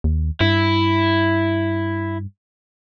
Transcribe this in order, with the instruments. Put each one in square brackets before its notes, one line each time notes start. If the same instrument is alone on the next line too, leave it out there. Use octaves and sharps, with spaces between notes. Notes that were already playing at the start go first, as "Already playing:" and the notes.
[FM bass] D#2
[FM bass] G2 [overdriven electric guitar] E4